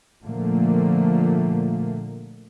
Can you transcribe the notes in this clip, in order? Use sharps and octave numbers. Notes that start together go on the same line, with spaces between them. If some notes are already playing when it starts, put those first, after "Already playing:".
A#2 D3 F3 A3 A#3